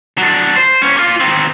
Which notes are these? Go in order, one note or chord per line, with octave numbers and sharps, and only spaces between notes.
F#3 D4
C5
A#3 C#4
A#3 F4
D#3 C4